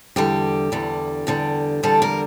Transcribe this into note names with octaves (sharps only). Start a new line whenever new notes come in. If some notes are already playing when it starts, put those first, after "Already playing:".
E2 D3 G3 G4
E2 D3 G3
E2 D3 G3
E2 D3 G3 A4
A#4